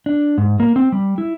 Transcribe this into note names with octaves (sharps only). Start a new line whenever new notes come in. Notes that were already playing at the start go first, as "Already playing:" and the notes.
D4
G#2
A#3
C4
G3
E4